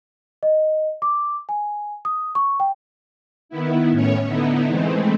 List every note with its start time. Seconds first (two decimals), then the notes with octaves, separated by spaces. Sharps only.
0.43 D#5
1.02 D6
1.49 G#5
2.05 D#6
2.35 C#6
2.60 G5
3.49 D#3 B3 E4
3.91 A2 C#4 C#5
4.26 D3 B3 D#4 E4
4.68 E3 G#3 A3 C4